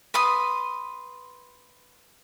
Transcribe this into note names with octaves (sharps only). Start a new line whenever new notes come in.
B4 C6 D#6